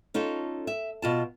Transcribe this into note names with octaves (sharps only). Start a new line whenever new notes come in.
C#4 D#4 F4 A4
E5
B2 F4 A5